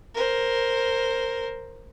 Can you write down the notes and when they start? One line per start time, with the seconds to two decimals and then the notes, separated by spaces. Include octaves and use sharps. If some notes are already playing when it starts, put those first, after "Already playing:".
0.15 A#4 C5